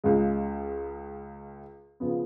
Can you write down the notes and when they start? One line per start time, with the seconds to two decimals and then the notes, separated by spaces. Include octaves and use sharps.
0.04 C#2 C#3 G#3
2.00 C#3 F3 B3